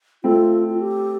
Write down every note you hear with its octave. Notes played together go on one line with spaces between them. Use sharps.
A3 C4 F4
F4
G4